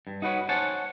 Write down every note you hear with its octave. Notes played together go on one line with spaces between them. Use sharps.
G2
D#4 F#4 A#4 B4 C#5
C5 C#5 F#5 G#5 A5